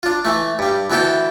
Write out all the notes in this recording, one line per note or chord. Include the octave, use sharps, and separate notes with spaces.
D4 F4
E3 A3
G2 G3
D2 E3 B3 E4 A4 G5